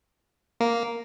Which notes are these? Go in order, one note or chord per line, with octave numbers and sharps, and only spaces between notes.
A#3